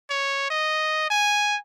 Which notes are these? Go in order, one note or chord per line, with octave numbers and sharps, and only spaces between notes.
C#5
D#5
G#5